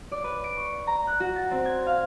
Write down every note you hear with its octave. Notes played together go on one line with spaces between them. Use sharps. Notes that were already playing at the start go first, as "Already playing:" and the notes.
D5
B4
D7
C#6
A#5
F#6
F#4
A6
C4
G#6
F5